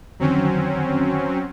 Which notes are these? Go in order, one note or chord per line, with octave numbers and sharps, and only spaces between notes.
F2 D3 D#3 F#3 C4 C#4